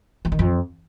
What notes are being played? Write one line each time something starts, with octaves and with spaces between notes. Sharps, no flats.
E3
D#3
F2